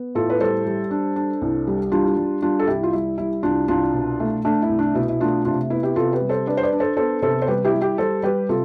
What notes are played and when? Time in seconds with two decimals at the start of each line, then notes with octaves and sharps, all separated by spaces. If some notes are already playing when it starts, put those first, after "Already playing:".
Already playing: B3
0.15 A2 F4 A4
0.30 B4
0.40 G3 A4 C5
0.66 G3
0.91 D4
1.16 D4
1.41 C2
1.67 G3
1.92 G3 D4 F4
2.17 G3
2.42 G3 D4 F4
2.59 A4
2.67 C2 E4 G4
2.83 F4
2.93 G3 E4
3.18 G3 E4
3.43 C2 D4 F4
3.68 C2 D4 F4
3.94 B2
4.20 A3
4.45 A3 D4
4.62 E4
4.69 C2
4.79 D4
4.95 B2 E4
5.09 E4
5.20 A3 D4 F4
5.45 C3 D4 F4
5.70 B3 E4
5.83 E4 G4
5.96 C3 F4 A4
6.13 G4 B4
6.21 G3
6.29 A4 C5
6.47 D4 B4 D5
6.57 C5
6.63 B4 D5
6.72 D4
6.80 A4 C5
6.97 B3 A4 C5
7.22 C3 A4 C5
7.42 C5
7.47 G3 G4 B4
7.64 E4 G4
7.74 G3
7.81 E4 G4
7.98 G3 A4 C5
8.23 G3 G4 B4
8.49 C3 F4 A4